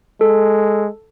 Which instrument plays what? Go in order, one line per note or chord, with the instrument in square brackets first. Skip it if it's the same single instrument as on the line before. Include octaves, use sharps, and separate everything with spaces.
[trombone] G#3 [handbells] A4